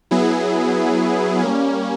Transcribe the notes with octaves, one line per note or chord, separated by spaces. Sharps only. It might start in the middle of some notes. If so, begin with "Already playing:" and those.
F#3 B3 E4 G#4
G3 A#3 C#4